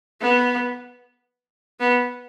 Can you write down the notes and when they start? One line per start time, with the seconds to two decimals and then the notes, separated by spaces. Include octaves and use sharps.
0.21 B3
1.80 B3